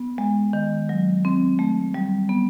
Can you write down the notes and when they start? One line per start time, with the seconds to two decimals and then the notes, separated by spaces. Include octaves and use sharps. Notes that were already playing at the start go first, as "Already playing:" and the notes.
Already playing: B3
0.18 G#3
0.53 D#3
0.89 F#3
1.25 C4
1.59 A3
1.94 G3
2.29 B3